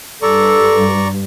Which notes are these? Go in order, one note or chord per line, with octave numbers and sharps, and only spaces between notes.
G2 A4 D5 A#5 C#6